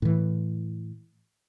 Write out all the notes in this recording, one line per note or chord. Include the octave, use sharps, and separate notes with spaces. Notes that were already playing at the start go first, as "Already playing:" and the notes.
A2 E3